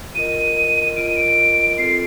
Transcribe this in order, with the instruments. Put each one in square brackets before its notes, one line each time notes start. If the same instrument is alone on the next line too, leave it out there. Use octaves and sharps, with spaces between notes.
[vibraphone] F4 A#4 D#5 [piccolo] D#7
[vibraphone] F4 A#4 D#5 [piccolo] D7
[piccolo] D#7
D7
[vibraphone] C4 F4 A4 [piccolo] C7